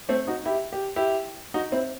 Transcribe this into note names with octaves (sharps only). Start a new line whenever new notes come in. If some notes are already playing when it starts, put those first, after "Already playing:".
A3 C4
D#4 F#4
E4 G4
G4
E4 G4
D#4 F#4
C4 E4